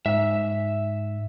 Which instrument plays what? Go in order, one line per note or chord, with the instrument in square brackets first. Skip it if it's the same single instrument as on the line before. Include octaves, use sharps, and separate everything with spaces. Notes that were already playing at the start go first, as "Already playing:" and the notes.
[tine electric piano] G#2 [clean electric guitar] E5